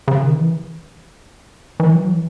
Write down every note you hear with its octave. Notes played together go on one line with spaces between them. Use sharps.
C#3
D#3
E3
E3
F#3
E3